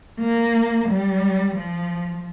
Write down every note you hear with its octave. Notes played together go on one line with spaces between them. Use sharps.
A#3
G3
F3